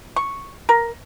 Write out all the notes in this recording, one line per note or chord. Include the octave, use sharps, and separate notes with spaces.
C#6
A#4